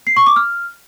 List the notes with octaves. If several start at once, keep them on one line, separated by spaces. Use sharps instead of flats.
C7
C#6
D6
F6